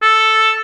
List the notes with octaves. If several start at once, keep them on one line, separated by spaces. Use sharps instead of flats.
A4